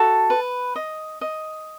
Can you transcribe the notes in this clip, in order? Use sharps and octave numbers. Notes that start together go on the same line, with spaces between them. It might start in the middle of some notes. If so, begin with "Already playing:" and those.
Already playing: F#4 A4 A5
B4
D#5
D#5